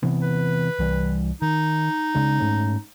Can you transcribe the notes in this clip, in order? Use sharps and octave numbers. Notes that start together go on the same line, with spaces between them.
C3 E3 B3
B4
C2 E3 G3
D#3 D#4
C#3 G#3 D4
G#2 A3 C#4